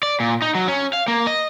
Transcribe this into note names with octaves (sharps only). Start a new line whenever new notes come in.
D5
A#2
D#4
F#3
C#4
F5
A#3
D#5